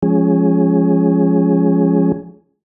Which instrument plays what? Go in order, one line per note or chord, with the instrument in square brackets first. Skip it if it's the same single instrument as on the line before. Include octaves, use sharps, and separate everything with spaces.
[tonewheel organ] F3 G#3 C#4 G#4